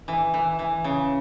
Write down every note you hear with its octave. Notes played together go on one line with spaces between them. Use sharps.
E3
E3
E3
C#3